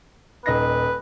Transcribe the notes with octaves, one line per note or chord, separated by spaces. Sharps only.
D#1 D#4 B4 A#6